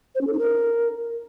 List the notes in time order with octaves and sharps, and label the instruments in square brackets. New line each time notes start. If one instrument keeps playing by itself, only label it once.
[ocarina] C5
C#4
A4
D#4
A#4